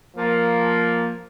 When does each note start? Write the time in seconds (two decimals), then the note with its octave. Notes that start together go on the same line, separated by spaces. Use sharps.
0.16 F3 A#3